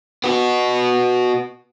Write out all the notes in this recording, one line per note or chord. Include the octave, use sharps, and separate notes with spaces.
B3 F#4